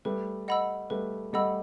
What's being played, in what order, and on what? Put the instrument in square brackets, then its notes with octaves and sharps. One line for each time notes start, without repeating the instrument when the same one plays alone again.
[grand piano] G3 A3 [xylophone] B4
[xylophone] D#5 F#5 B5 E6
[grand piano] G3 A3 [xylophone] B4
[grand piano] G3 A3 [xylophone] D#5 F#5 B5 E6